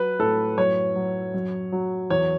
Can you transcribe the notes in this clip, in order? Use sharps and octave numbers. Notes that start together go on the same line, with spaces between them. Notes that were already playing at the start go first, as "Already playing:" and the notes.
Already playing: F#3 B4
A2 A4
F#2 C#5
F#3
F#2
F#3
E2 C#5